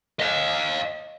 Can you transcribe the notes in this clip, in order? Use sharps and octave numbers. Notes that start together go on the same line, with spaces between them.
D#5 F5